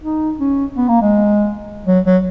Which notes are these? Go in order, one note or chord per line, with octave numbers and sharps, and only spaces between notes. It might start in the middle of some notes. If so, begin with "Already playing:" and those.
D#4
C#4
B3
A#3
G#3
F#3
F#3